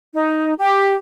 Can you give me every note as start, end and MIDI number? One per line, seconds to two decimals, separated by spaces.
0.13 0.52 63
0.57 0.93 67